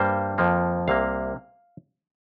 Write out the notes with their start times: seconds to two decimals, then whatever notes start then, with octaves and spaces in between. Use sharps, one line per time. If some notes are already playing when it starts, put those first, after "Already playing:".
Already playing: G2 G3 A#3 C5
0.38 F2 F3 A#3
0.88 C2 C3 A#3 F5